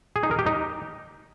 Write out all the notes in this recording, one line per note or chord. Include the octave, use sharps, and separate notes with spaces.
G#4
D#4
A#4
G4
D#4